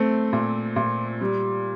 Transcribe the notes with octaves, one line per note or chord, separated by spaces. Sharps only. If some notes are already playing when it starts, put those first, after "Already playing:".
Already playing: A3 C4
A#2
A#2
G3